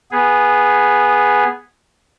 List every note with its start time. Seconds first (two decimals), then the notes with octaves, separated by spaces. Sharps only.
0.11 B3 G#4